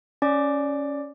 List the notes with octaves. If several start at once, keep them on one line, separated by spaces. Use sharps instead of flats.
C#4 D5 D6